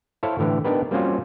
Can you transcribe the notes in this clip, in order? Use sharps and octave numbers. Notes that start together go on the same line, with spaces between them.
E4 A4 C5 C#5 F5
A2 D3 E3 G4
B3 D4 D#4 G4 A#4 B4
G3 A#3 C4 C#4 F4 F#4